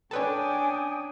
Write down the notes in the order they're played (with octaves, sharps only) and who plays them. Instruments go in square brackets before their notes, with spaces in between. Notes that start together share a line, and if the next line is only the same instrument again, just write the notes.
[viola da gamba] C#4 D4 [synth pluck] A4 B4 C#5 [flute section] G5 G#5 D#6